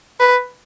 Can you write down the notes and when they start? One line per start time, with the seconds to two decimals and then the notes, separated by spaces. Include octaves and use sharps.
0.20 B4